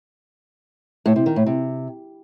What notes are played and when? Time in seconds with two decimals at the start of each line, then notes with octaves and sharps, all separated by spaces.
1.06 A2
1.16 C3
1.26 D#3
1.36 A2
1.46 C3